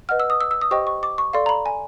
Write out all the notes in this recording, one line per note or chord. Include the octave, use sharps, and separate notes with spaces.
B4 D#5 F#5 F6
E6
D#6
E6
E6
D#6
G4 C5 D#5 G5 C#6
C#6
D6
C#6
A4 D5 F5 C6
A#5
B5
G#5